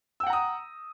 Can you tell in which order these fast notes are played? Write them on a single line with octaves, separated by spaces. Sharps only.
E6 G5 F#5 A#5 D#6